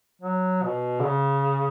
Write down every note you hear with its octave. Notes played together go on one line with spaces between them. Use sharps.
F#3
B2
D3
C#3